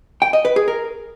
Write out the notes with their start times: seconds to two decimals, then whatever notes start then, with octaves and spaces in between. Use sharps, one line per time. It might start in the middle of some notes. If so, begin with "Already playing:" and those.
0.22 G5
0.33 D#5
0.45 B4
0.56 G#4
0.68 A#4